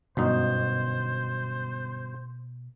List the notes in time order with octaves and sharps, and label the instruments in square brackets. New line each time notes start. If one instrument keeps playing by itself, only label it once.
[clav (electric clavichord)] G1 F#2 D#4 [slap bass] B2 [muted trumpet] C5